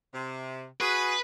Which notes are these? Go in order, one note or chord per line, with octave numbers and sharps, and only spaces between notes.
C3
F#4 G#4 B4